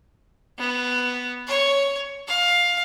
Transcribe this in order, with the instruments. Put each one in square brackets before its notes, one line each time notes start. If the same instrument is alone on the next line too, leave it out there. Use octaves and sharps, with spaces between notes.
[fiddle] B3
C#5
F5